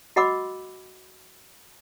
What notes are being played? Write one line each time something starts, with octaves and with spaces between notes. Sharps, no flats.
F#4 D#5 F#5 B5 D6 E6